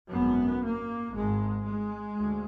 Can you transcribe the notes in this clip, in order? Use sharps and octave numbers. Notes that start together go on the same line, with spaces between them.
G#1 F#2 B3
A#3
G#1 G#2 G#3
G#3
D2